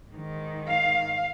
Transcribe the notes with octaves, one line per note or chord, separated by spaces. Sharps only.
G#2 D#3
F5